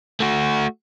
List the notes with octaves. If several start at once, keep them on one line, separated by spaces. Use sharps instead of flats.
A3 F#4